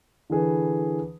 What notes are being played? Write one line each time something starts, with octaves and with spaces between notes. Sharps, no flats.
D3 E3 G#4 B4